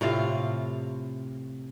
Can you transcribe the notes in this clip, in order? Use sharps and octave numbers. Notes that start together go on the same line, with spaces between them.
A2 C3 F4 F5